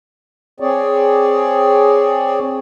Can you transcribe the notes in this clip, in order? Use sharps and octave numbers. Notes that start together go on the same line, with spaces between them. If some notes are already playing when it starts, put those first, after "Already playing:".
C4 G#4 C#5 D5